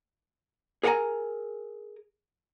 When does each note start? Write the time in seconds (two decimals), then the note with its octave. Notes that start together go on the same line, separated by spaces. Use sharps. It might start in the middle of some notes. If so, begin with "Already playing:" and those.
0.83 G#4 A#4 F5 F#5 G#5 A#5